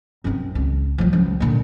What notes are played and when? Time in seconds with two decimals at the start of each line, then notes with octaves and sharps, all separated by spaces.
0.24 F#2 C4
0.55 C#2
0.98 F3 F#3
1.13 C#2
1.40 A#2 D3